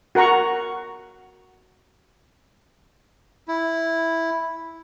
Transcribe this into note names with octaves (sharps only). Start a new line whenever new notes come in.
F#4 A#4 F#5 A#5 C#6
E4